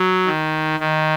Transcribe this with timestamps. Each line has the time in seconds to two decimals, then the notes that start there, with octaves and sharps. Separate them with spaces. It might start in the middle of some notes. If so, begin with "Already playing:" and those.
Already playing: F#3
0.27 D#3
0.80 D#3